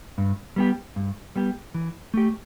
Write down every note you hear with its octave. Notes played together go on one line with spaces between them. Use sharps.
G2
G3 B3 G4
G2
G3 B3 G4
E3
A3 G4